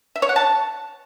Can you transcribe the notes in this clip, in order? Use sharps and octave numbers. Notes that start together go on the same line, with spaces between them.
E5
C#5
F#5
A5